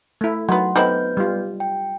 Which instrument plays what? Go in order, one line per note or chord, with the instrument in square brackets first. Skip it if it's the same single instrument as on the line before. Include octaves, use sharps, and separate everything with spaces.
[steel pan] A3 E4
[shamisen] D#3 B3 [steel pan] F#3 [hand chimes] F#5 C6
[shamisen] D3 C4 E4 [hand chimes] B3 B4 G6 [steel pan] D#4
[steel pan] G3 F4
[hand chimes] G5